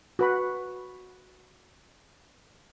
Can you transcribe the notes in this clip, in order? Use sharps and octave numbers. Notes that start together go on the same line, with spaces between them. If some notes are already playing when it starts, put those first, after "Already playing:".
F#4 B4 B5